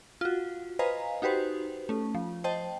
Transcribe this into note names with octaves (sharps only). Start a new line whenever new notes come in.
F4 F#4
B4 C5 D#5 F5 G#5 A#5
D#4 F#4 G4 B4 C5
A3 C#4
F3
C5 D#5 G5 A5